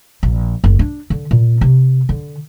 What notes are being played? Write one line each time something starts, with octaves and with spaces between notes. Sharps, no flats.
A#1
F#1
D4
D3
A#2
C3
D3